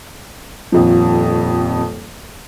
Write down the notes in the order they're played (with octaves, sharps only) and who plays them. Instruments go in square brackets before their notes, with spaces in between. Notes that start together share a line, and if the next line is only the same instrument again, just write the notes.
[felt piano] D#1 F2 F3